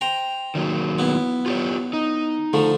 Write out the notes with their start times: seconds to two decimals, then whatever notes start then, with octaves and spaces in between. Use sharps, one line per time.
0.01 C5 G5 A#5
0.55 D#3 F#3 A#3
0.99 B3 E4
1.46 F4 G4 C#5
1.93 D#4
2.53 D3 F3 A3